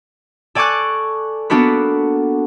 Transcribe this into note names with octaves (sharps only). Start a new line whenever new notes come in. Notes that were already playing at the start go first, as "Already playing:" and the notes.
A4 D5 G#5 C#6 D6 F#6
A#3 B3 D4 F#4 A4 B4